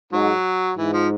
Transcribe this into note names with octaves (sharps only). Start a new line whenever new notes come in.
G#2 F#3
G#2 E3
F3